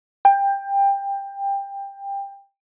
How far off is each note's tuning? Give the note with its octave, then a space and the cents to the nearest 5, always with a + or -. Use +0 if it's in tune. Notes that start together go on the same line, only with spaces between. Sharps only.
G5 +20